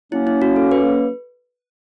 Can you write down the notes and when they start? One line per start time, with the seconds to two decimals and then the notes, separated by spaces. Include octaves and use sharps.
0.11 F#3 A#3 C#4 E4
0.27 E4
0.42 F#4
0.56 A4
0.71 B4